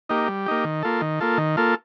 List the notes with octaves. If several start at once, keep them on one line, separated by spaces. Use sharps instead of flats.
A#3 D#4 G4
G3
A#3 D#4 G4
D#3
A#3 F4 A4
D#3
A#3 F4 A4
D#3
A#3 F4 A4